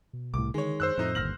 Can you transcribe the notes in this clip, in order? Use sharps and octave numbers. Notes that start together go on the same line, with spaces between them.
B2
C2 A2 D6
D3 D#3 G#3 C#5
F#2 C5 E6 F#6
F2 A2 A3 D#4
G1 D#2 F6 A#6 F#7